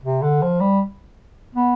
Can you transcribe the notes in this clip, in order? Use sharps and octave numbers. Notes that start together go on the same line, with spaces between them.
C3
D3
F3
G3
B3